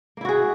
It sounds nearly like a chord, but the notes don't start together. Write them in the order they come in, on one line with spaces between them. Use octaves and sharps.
A#3 E4 F#4 G#4